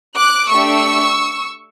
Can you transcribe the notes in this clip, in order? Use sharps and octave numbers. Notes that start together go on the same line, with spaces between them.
D6 F#6
A3 D4 G4 C#6 E6